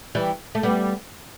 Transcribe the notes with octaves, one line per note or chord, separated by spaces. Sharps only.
E3 G3
A3
G3 B3